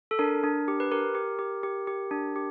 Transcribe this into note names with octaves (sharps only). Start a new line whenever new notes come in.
A4
D4 A#4
D4
G4
B4
G4 A#4
G4
G4
G4
G4
D4
G4